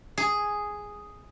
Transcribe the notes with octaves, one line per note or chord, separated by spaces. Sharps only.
G#4